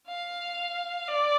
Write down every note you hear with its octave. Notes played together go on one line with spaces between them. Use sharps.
F5
D5